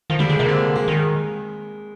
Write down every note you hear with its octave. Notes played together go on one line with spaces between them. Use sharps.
D#3 F3
D3 G3
D3 G#3
C3 A#3
D3 C4
G#3
D#3 G#3